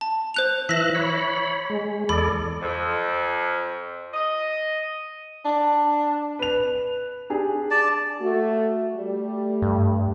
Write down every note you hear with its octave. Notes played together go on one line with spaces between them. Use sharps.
A5
C5 F#6 F7
E3 E5 F#6 A#6 B6
C#5 B5
G#3
E2 A4 D5 B5
F2
D#5
D4
B4 F7
D4 G4 G#4
D5 A5
A3 F#4
G3 A3
G2